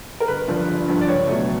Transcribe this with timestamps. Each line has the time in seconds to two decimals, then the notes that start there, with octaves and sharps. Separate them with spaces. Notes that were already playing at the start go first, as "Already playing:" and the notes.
0.20 A#4
0.28 G1 B4
0.48 G2 D3 F3
0.68 G1
0.88 G2 D3 F3
1.01 D5
1.08 C#2 C#5
1.28 B2 F#3 A3